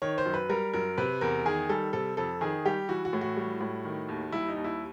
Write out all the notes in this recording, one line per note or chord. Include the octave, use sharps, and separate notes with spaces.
D#3 C#5
C5
F#2
B4
G3 A#4
F#2 A#4
C3 B4
E2 A#4
D#3 G#4
G3 A4
C3 A4
F2 A4
D#3 G#4
G3 G4
E3 F#4
F#4
A2
F#4
G3
A2
D#3
D#2
G3 E4
D#4
D#2
E4